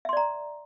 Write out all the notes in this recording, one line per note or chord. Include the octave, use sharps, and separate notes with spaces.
D5 E5 A#5 C6